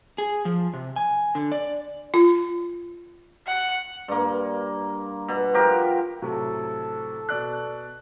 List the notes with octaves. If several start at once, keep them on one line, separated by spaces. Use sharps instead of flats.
G#4
F3
C3
G#5
D3
D5
F4
F#5
G2 A#3
B2
F3 F#4 G4 A#4
A2 C3 F#3 A4
B2 D5 F#6